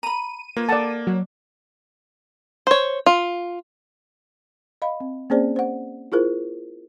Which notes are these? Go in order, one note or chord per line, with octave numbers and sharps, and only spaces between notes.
A#5 B5 D#7
A#3 F4 B4 C#5
A4 D5 F#5 A5
F#3
C5 C#5
F4
D#5 F5 B5
C4
A#3 C4 C#4 G#4 C5 D5
C5 F#5
E4 F4 G#4 A#4 C5